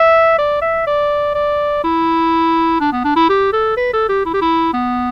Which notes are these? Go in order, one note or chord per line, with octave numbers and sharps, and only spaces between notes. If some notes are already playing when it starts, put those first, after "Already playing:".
Already playing: E5
D5
E5
D5
D5
E4
D4
B3
D4
E4
G4
A4
B4
A4
G4
E4
G4
E4
B3